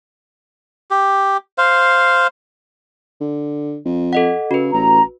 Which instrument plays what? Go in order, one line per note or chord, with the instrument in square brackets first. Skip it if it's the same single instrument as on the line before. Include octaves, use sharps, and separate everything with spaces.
[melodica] G4
C5 F5
[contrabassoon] D3
F2
[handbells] A4 D#5 F#5
[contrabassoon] C#3 [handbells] F#4 B4
[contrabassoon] A1 [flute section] A#5